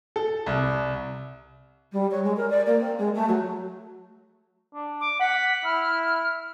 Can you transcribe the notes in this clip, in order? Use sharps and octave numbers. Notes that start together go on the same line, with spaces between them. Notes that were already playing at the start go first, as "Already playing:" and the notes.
A4
C2
G3
C#5
G#3
A#4
D5
A#3
C4
G#3
A3
F#3
D4
D6
F#5 B6
E4 F6